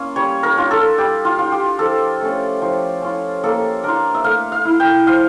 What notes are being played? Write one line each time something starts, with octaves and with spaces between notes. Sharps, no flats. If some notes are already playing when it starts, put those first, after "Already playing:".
Already playing: A#3 C#4 F4
G3 C#5
A#4
D4 F4
A4
G3 G4
F4
D4 F4
G4
F3 A4
A3 C#4
F3
C#4 F4
A#3 A4
D4 F4 A#4
E5
A3 F5
F5
E4
G5
F3 F5